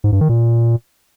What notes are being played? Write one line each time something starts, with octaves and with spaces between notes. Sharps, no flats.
G#2
G2
D#3
A#2